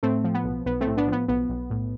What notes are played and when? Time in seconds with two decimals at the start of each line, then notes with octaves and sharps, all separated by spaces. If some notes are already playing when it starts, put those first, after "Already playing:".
0.03 A2 A3 C4
0.24 F3
0.34 B3
0.44 B1
0.66 B1 B3
0.81 A3 C4
0.87 A2
0.97 B3 D4
1.08 F3 B3
1.28 B1 B3
1.49 B1
1.70 A2